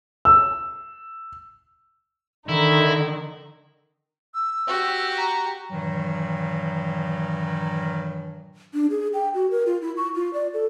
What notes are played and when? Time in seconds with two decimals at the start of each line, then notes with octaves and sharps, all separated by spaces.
0.25 E6
2.48 D3 D#3 D#4 E4
4.34 E6
4.68 F#4 G4
5.18 A#5
5.71 G2 A#2 D#3 E3 F#3
8.74 D4
8.90 G#4
9.14 G5
9.34 F#4
9.51 A#4
9.66 F4
9.82 E4
9.97 C#6
10.15 F4
10.33 D5
10.54 A4